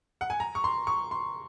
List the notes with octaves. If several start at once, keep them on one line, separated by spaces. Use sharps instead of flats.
F#5
G#5
A#5
C#6
C6
C#6
C6